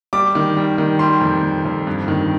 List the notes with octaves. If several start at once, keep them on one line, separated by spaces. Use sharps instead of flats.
G3 D6
D#3
G3
D#3
G3 C6
F2
F2
F2
G2
D#3